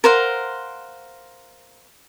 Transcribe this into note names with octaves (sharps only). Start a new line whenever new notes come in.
A#4 C5 F5 F#5